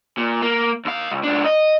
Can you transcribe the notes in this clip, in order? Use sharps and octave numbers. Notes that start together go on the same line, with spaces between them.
A#2
A#3
D#2 F5
C#2
C#2 D4
D#5